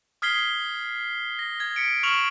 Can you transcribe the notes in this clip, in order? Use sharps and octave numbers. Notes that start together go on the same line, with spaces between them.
D#6 F6 G#6 B6 C7 G7
A#6
G#6
B6 C#7 D7
C#6 F6 F7 F#7